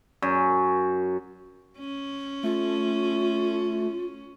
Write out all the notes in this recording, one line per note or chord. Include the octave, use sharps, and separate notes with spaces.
F#2
C#4
A3 F4